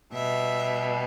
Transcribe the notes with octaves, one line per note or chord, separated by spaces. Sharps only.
B2 G3 E5